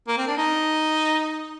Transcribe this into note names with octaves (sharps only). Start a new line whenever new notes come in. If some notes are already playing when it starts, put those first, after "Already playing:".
A#3
C4
D4
D#4